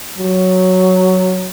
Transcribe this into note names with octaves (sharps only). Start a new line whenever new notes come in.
F#3